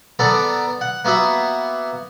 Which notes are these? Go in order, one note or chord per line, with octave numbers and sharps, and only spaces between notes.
B3 A4 A#4 D5
F#5
A#3 B3 F#4 E5